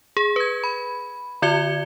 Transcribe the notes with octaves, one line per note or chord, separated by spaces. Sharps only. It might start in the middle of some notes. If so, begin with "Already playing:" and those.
G#4
B4 G#6
B5
D3 F4 D5 G#6 C#7 G7